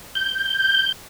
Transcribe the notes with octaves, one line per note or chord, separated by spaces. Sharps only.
G6